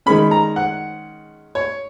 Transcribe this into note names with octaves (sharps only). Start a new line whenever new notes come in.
D#3 G#3 C#4 B5
A#5
F#5
C#5